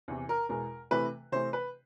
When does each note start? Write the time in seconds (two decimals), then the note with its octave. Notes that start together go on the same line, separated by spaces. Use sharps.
0.08 E2 C3 E3
0.29 A#4
0.49 E2 B2 G#3 A#4
0.91 C3 E3 A3 B4
1.32 C3 E3 A3 C5
1.53 B4